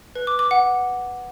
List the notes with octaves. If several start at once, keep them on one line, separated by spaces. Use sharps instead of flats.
B4
D6
D6
F#5